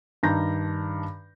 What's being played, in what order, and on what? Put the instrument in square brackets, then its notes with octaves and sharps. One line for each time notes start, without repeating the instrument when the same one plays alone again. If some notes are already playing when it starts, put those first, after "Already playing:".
[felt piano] G2 D#3 D4 A#5 G6 A#6